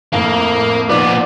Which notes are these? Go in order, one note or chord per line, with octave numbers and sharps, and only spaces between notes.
F2 A2 A#3 F5
A#2 F3 B3 D#4 D5